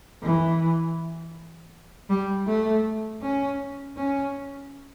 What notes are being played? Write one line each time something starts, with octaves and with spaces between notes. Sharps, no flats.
E3
G3
A3
C#4
C#4